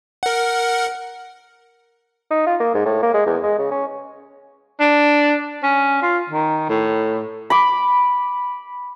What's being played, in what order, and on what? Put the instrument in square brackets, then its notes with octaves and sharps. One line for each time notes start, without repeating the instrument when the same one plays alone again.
[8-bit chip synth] A#4 F#5
[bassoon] D#4
F4
A#3
G#2
A2
A#3
G#3
E2
G#3
C#3
C#4
[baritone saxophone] D4
C#4
F4
D#3
A2
[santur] B5 D6